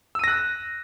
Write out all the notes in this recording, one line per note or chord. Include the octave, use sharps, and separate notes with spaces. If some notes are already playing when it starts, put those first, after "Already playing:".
E6 F#6 A#6 D#7